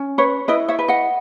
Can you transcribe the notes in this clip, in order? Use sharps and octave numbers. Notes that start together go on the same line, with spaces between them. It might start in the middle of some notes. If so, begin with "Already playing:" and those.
Already playing: C#4
B4 C#5
E4 B4 D#5
C#5 E5
B4
D#5 F#5